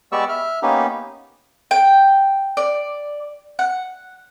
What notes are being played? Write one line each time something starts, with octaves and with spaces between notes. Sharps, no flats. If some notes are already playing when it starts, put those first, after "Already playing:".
G#3 B3 G4 D5 C#6 E6
E5 F6
A#3 B3 C#4 D#4 G4
G5
D5
F#5